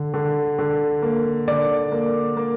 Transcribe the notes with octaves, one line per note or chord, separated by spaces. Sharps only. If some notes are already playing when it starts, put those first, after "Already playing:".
Already playing: D3
D3
D3
A#3
D3 D5
A#3
A#3